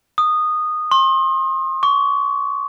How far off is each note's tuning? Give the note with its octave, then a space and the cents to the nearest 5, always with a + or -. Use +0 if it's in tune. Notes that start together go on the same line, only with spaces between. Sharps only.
D#6 -15
C6 +35
C#6 +35